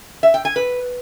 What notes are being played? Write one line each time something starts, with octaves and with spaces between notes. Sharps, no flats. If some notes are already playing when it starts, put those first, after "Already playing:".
E5
G5
G#5
B4